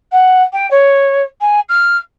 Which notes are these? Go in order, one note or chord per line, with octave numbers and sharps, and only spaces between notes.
F#5
G5
C#5
G#5
F6